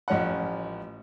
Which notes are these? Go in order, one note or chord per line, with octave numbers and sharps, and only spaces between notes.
A1 F3 C#4 D#5 F#5